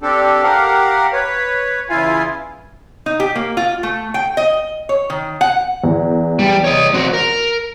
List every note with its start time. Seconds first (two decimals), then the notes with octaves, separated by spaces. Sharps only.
0.02 C4 D4 G4 A4
0.43 G4 A#4 F5 F#5
1.13 B4 C#5
1.90 E2 C#3 E4 F4 F5 G#5
3.06 D#4
3.20 G4
3.35 A#3
3.57 F4
3.83 A3
4.14 G5
4.37 D#5
4.89 C#5
5.10 D#3
5.41 F#5
5.84 E2
6.39 G3
6.64 C#5 D#5
6.94 C4 F#4
7.13 A#4